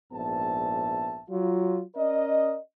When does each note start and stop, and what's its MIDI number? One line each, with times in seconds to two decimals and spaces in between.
0.13 1.22 34
0.13 1.22 44
0.13 1.22 59
0.13 1.22 76
0.13 1.22 81
1.30 1.82 54
1.30 1.82 65
1.96 2.58 61
1.96 2.58 70
1.96 2.58 74
1.96 2.58 75